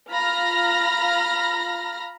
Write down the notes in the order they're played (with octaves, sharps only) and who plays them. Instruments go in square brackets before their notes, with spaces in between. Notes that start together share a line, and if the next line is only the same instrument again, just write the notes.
[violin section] F4 A#5 B5 F6 A#6